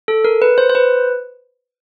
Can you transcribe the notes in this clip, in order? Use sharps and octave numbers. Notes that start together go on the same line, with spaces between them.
A4
A#4
B4
C5
C5
B4